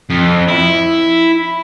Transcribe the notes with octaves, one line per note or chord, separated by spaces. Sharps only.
F2
E4